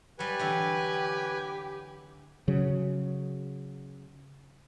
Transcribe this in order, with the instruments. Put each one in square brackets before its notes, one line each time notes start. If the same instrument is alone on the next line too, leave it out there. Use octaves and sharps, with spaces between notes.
[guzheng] F#3 G3 [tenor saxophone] G4 [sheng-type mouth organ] B4 G#5
[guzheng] D3 E3 F#3
[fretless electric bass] C#3 F#3